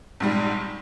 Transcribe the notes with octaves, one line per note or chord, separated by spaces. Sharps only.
A#1 G#2 G3